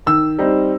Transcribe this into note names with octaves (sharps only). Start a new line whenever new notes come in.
D#3 E6
G3 C4 D#4